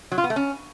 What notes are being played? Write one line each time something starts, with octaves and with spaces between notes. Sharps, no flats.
F#3
F4
B3
A3
C#4